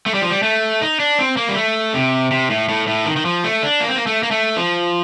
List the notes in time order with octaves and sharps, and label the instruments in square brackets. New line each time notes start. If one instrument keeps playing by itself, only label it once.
[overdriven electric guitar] A3
G3
F3
G3
A3
D#4
D4
C4
A#3
G3
A3
C3
C3
A2
A2
A2
D#3
D#3
F3
A3
D4
A#3
C4
A#3
A3
A#3
A3
F3